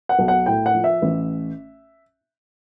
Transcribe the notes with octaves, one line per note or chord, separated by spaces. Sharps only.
F#5
B1
F#5
A2 G5
F#5
F3
E5
A1